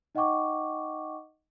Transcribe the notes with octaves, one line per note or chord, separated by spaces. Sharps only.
D#4 D#5 F#5 G5 C#6 D6